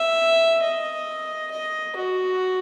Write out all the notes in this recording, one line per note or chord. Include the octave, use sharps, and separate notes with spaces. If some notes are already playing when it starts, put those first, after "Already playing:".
Already playing: E5
D#5
D#5
F#4